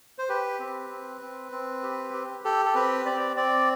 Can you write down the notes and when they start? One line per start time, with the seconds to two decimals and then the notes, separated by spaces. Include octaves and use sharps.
0.19 C5
0.29 G4 B4
0.60 C4
0.90 C4
1.21 C4
1.52 C4
1.83 G4
2.13 G4
2.44 G4 A4
2.65 A4
2.75 C4 B4
3.06 C4 D5
3.36 C4 D5